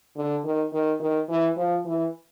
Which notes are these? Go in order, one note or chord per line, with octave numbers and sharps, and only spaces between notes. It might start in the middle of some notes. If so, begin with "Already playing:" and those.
D3
D#3
D#3
D#3
E3
F3
E3